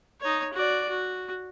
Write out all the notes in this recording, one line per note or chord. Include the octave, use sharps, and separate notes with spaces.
D#4 C#5
F#4 D5
F#4